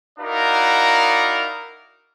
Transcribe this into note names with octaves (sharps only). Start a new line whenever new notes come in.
D#4 E4 F#4 A#4 D5 F5